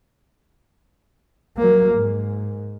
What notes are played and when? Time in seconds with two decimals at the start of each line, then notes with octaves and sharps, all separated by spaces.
1.57 F#3 A#3
1.94 G#2